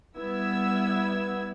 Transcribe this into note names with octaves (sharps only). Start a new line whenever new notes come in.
G3 B3 E4 E6 G#6